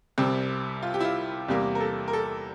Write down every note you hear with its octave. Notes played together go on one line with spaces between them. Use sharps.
C2 C3 G3 C4
F4
G4
E4
F4
E2 C3 G3 A#3
A#4
A4
A#4
A4